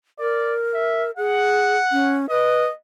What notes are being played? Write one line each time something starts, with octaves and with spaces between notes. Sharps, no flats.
A#4 D5
E5
G#4 F#5
C#4
B4 D#5